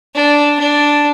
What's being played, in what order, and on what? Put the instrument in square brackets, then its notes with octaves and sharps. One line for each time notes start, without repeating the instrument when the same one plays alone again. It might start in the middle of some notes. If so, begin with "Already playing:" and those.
[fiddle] D4
D4